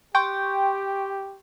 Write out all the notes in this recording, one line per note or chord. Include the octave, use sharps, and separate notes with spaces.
G4 G5 C6 C#6 G6